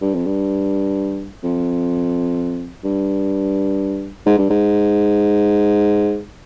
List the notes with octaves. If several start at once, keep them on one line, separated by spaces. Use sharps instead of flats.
G2
F2
G2
F2
G2
G#2
G2
G#2